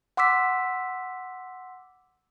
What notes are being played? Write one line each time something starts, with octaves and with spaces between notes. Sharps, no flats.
F#5 C6 D6 E6 B6